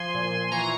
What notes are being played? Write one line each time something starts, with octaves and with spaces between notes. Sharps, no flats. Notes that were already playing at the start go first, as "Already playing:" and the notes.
Already playing: F3 G#5 C6
A#2
E3 A#5 C#6